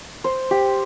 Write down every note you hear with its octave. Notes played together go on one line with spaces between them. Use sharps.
C5
G4